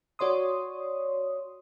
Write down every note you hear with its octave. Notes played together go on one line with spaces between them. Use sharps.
F#4 C#5 D5 C6 D#6